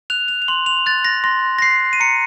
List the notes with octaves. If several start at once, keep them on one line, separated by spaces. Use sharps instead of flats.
F#6 F7
F7
F7
C6 F#7
F7
F#6 A6
A#6
C6 A#6
A#6
F#6 C7
D#7
A#5 C#7